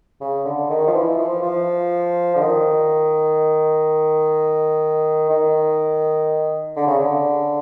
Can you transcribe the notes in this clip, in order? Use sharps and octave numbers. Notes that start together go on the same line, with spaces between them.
C#3
D3
D#3
F3
E3
F3
F3
D3
D#3
D#3
D3
C#3
D3